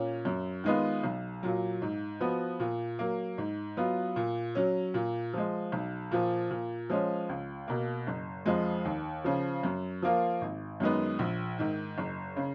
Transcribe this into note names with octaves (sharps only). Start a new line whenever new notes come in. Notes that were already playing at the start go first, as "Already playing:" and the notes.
Already playing: A#2 C#4
F#2
D#3 G#3 B3 F4
B1
A#2 F#3
G#2
F3 B3 F#4
A#2
F#3 A#3
G#2
F#3 B3 F4
A#2
F#3 C#4
A#2
F3 G#3
B1
A#2 F3
A#2
F3 G#3 C#4
C#2
B2 A#3
F#1
F2 F3 G#3
D#2
C#3 F3
F#2
F3 A#3 F4
G#1
F#2 D#3 G#3 B3
A#1
G#2 D#3
F#1
C#3